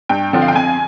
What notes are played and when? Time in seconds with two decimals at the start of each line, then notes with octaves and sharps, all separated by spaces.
0.09 G2 G5
0.33 D3 F3 C4
0.42 F5
0.48 G5
0.55 F2 G#5